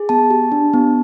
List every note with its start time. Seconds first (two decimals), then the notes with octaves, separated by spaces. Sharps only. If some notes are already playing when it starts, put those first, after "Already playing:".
Already playing: G#4
0.09 B3 A5
0.30 G4
0.52 D4
0.73 B3